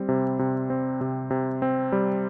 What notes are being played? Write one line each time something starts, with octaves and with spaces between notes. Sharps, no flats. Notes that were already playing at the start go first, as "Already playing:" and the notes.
Already playing: G3 C4
C3
C3
C4
C3
C3
C4
G3